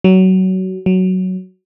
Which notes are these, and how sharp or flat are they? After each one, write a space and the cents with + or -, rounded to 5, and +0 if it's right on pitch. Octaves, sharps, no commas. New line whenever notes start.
F#3 +20
F#3 +5